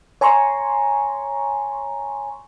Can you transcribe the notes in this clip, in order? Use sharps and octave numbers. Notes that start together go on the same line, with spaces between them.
C#5 G#5 A#5 C6 C#6